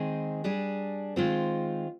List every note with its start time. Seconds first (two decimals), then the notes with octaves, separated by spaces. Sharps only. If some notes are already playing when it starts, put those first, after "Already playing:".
Already playing: D#3 G#3 C4 D#4 G#4
0.44 G3 D4 G#4
1.16 D#3 G#3 C4 F4 C5